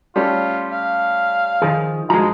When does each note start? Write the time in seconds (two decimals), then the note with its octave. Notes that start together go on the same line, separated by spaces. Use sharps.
0.16 G3 A3 C#4 F4
0.71 F5
1.62 D#3 F3 G#4
2.10 G2 F3 G#3 F#4 A#5